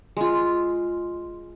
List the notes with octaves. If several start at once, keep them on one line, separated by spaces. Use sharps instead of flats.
G#3 F4